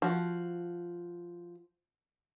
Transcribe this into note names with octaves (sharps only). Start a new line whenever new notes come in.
F3 F#4